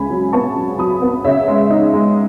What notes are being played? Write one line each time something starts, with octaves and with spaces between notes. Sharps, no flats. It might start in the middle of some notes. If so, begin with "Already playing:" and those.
Already playing: C#2 C#3 G#5 B5
F#3
B3 A5 C#6
F#3
F#3 B5 D#6
B3
C#3 C#5 E5
G#3
D#4
G#3